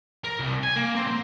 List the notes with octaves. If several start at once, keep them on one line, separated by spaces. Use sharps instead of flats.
A#4
C2
G#5
A#3
C4
A#3